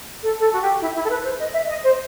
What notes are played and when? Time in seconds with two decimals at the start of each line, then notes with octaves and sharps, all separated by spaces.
0.23 A4
0.42 A4
0.55 F#4
0.62 G4
0.81 E4
0.95 E4
1.04 A4
1.10 B4
1.24 C5
1.39 D#5
1.53 E5
1.68 D#5
1.82 C5